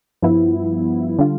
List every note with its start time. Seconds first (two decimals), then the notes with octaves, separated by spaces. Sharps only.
0.22 G2 F3 B3 E4
1.19 D3 G3 D4 F4